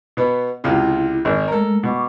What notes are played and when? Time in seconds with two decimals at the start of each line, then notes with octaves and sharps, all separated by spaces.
0.17 B2 B3
0.64 C#2 C3 E4 F4
1.25 G#1
1.48 G#3 A3 A4 A#4
1.83 B2 F#5 C#6 D6